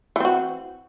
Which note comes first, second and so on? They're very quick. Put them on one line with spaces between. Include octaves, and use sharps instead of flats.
E3 C4 F#4